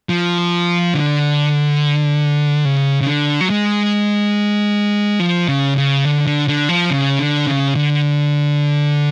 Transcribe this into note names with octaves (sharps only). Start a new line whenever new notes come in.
F3
D3
C#3
C#3
D3
F#3
G#3
F3
C#3
C#3
D3
D3
D3
F3
C#3
D3
C#3
D3